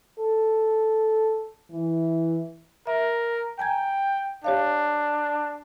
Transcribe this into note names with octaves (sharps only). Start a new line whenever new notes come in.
A4
E3
A#4 E5
G5 G#5 A#5 G#6
D4 G4 C#5 F5